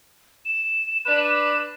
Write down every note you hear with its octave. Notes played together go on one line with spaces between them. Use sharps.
E7
D4 B4